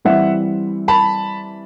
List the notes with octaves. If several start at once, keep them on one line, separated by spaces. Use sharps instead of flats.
E3 G3 C4 E5 F#5
A5 B5